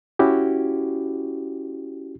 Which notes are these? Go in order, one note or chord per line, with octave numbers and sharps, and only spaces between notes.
C#4 E4 F#4 G4